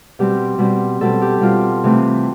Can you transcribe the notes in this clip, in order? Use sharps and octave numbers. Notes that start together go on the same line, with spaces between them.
B2 G3 C4 G4
B2 G3 C4
B2 G3 C4 A4
G4
B2 G3 C4 F4
C3 E3 A3 C4